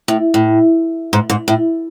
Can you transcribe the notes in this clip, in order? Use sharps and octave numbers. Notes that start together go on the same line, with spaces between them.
A2
A2
G#2
G#2
A2